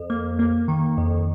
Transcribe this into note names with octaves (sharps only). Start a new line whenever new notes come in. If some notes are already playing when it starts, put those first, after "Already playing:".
Already playing: F2
A#3
A#3
D#3
F2